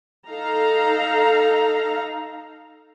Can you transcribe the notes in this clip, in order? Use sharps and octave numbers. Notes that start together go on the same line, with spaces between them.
D#4 A4 F5 A#5